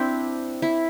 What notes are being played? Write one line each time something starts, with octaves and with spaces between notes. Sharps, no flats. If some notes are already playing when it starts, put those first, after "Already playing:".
Already playing: C4 D4 E4
E4